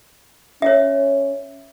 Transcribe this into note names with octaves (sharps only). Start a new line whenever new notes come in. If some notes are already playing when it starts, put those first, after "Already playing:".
C#4 C#5 E5